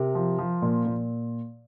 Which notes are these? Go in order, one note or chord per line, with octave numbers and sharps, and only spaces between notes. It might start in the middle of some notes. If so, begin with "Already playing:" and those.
Already playing: C3 A#4
F3
F3
A#2
A#2